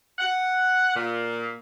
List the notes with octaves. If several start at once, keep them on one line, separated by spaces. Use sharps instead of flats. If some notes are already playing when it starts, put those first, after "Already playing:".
F#5
A#2